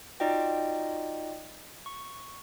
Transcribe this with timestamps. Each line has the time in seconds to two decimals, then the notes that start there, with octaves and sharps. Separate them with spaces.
0.20 D#4 F4 F#4 D5 D#5 G5
1.86 C#6